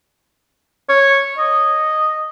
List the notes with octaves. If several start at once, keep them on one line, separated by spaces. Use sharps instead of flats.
C#5
D#5